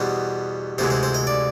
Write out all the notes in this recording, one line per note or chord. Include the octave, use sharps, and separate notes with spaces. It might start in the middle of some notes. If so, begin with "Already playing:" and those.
Already playing: E2 B2 G3 C5
D2 C3 E3 G#3 C5
C5
C5
D#5
D5